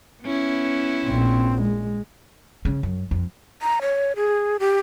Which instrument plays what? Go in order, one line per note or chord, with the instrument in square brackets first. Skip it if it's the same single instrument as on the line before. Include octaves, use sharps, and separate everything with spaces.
[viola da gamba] B3 C#4 E4
[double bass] A#1 C4
G#3
[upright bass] C#3
F#2
F2
[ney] A#5
C#5
G#4
G4